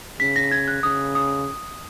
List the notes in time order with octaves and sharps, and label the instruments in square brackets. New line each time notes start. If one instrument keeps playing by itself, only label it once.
[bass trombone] C#3 [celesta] B6
[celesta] A#6
G#6
F#6
[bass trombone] C#3 [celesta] D#6
[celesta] D#6